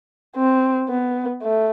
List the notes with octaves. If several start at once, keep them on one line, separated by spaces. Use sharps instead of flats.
C4
B3
A3